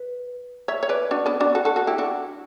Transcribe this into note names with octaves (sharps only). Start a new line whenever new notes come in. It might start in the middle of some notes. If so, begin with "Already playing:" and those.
Already playing: B4
C#5 E5
C#5
B4 D5
D4 F#4
B3 D4
D4 F#4
F#4 A4
F#4 A4
F#4 A4
E4 G4
D4 F#4